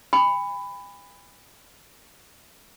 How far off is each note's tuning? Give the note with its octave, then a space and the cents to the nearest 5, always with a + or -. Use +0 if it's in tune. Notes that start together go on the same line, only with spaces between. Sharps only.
G#5 -45 B5 +15